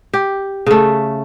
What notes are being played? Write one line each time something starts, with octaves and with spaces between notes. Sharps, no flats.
G4
C#3 A3